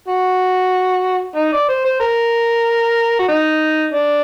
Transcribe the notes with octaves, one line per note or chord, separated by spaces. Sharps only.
F#4
D#4
D5
C5
C5
A#4
F#4
D#4
D4